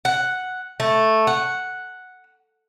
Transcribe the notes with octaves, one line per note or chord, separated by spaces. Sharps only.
F#5
A3
F#5